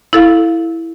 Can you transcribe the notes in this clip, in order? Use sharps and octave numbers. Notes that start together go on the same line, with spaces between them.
E4 A4 F5